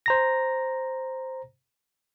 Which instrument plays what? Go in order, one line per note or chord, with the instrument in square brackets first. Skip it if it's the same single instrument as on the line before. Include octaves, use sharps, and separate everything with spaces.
[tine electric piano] C5 A#5 A#6